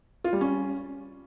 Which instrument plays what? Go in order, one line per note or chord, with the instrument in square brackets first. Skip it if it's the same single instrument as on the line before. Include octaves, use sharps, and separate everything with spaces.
[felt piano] F4
G3
C#4